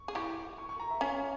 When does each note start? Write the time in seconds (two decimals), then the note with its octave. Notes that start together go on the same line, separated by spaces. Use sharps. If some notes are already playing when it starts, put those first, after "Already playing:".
Already playing: C#6
0.08 G#4
0.15 E4 G4 C#6
0.58 C#6
0.69 C#6
0.80 A#5
0.90 E5
1.01 C#4 F4 C#5